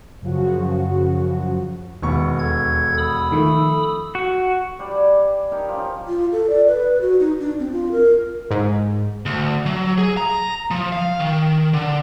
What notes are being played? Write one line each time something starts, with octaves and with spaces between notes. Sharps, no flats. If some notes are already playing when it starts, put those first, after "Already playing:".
F#2 C#3 F3 F#4
E1 D#2 B3 C#6
A4 G#6
B5 D#6 E6
D#3 F3 A3
F#4
G3 D4 D5
B4 G#5
D#4 G4 A#4
F3 C#4
F4
A4
D5
B4
F#4
D#4
D4
C4
F4
A#4
G#2
D2
F#3
G#4
A#5
F3
F5
D#3
D3